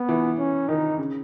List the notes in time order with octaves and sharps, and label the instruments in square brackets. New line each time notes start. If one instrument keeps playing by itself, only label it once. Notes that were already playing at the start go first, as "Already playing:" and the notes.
Already playing: [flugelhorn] B3
[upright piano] E3
[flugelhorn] C#4
[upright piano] D#3 [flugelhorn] D#4
[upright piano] C#3